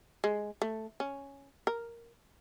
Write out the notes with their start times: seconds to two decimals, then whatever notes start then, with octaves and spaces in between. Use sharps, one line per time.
0.24 G#3
0.62 A3
1.00 C#4
1.67 A#4